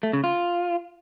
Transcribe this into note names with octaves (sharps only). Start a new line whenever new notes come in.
A3
C#3
F4